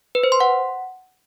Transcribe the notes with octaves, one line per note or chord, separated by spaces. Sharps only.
B4
C5
C6
F#5